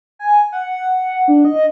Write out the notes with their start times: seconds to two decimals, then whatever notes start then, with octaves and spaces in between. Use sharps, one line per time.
0.19 G#5
0.52 F#5
1.28 D4
1.45 D#5